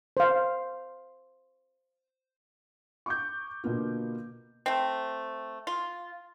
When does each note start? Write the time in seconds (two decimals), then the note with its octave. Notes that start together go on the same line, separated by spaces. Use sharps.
0.17 C5 F5
3.06 C#6 D6 G6
3.64 B2 D3 A#3 B3 F4
4.66 A3 C4
5.67 F4